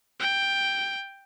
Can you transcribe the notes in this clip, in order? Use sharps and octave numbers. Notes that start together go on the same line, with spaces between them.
G5